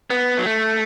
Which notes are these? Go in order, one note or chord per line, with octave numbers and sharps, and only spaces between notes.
B3
F#3
A3